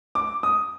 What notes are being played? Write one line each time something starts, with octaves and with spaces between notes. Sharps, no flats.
D6
D#6